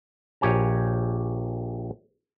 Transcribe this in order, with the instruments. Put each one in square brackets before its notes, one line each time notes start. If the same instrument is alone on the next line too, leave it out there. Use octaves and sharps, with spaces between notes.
[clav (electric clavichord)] A#1 G4 C#5 G#5 A#5